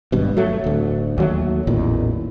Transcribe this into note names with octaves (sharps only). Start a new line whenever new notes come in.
G#1 G2 B2
F#3 A3
D1 D2
D#2 F#3 A3
A1 E2 A#2 D#3